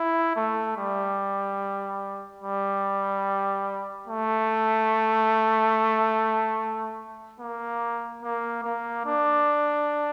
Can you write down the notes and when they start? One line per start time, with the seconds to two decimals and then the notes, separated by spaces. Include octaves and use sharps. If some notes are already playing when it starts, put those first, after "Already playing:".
Already playing: E4
0.36 A3
0.77 G3
2.42 G3
4.08 A3
7.40 A#3
8.23 A#3
8.64 A#3
9.06 D4